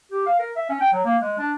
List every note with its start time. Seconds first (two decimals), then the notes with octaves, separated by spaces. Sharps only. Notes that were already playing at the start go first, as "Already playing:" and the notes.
0.11 G4
0.26 F5
0.39 A#4
0.56 E5
0.69 C#4
0.81 G5
0.93 F#3
1.05 A#3
1.22 G#3
1.38 D4